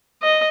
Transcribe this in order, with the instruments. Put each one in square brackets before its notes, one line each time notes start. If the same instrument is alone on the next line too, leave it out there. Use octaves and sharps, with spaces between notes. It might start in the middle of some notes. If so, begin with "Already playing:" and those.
[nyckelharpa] D#5